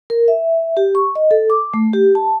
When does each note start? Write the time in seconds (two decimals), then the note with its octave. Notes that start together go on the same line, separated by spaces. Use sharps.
0.10 A#4
0.28 E5
0.77 G4
0.95 C#6
1.15 D#5
1.31 A4
1.50 D6
1.74 A3
1.93 G4
2.15 A5